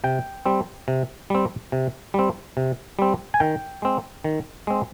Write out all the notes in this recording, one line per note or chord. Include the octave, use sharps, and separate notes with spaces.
C3 G5
G3 C4
C3
G3 C4
C3
G3 C4
C3
G3 C4
G#5
D#3 G5
G#3 C4
D#3
G#3 C4